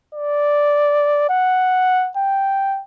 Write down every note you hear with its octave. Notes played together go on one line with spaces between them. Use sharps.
D5
F#5
G5